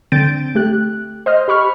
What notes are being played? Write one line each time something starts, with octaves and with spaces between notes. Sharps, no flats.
D3 C4 G6 A6 D7
A3 G4 F#6
C5 D#5 F6
G4 B5 C#6 F6